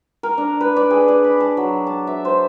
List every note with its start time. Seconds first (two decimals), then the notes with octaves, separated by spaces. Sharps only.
0.23 A#4
0.38 D4
0.61 B4
0.76 D5
0.91 G#4
1.08 D5
1.24 B5
1.40 A5
1.57 F#3
1.87 A5
2.07 E5
2.25 C5